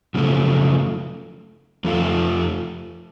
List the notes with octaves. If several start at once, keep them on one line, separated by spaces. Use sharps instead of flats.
F#2 C#3 F3 A3
F2 F3 A3 F4